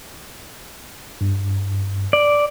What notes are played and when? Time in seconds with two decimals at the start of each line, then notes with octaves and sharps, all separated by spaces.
1.21 G2
2.13 D5